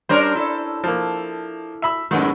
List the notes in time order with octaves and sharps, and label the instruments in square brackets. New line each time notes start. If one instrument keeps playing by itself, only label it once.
[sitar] G3 D4 A#4 [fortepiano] C#4 C5
[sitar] E4 A4
[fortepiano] F3 A#3
E5 B5 E6
[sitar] F#2 A2 G#3 [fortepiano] D#3 B3